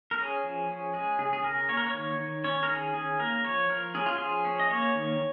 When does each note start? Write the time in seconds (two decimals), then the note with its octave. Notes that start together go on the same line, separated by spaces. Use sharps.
0.11 A#4
0.18 C#4 G#4
0.44 F3
0.69 C#4
0.93 G#3 G#4
1.18 C#3 G#4
1.33 G#4
1.43 C#3 A#4
1.69 A#3 C#5
1.77 A#4
1.86 C#5
1.94 D#3
2.19 D#3
2.44 C#4 C#5
2.63 A#4
2.69 D#3 G#4
2.94 C#4 G#4
3.19 A#3 A#4
3.44 F3 C#5
3.69 F3 A#4
3.94 C#4 G#4
4.06 F4
4.18 F3 G#4
4.45 C#4
4.60 D#5
4.70 A#3 C#5
4.95 D#3